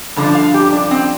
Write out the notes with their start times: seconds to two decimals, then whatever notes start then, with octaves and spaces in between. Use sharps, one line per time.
0.16 G2 D3 F3
0.35 F5
0.54 G4
0.73 D4
0.91 C4